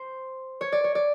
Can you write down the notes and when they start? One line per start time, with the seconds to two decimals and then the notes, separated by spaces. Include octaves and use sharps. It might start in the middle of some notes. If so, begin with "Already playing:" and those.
Already playing: C5
0.61 C#5
0.72 D5
0.84 C#5
0.95 D5